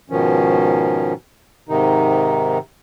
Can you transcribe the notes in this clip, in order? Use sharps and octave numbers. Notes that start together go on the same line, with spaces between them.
G#2 B2 D#3 F3 C#4
G#2 C3 D#3 D#4